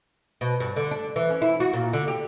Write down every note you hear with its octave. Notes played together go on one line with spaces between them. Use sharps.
B2
G2
D3
D4
E3
C#4
E4
F#4
A#2
D3
G4